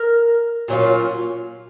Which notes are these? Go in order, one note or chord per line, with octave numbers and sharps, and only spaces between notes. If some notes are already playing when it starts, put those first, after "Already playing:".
Already playing: A#4
A#2 F#3 C#4 F4